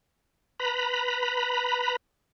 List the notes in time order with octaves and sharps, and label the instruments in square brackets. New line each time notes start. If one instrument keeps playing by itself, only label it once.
[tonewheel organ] B4 A#5 B5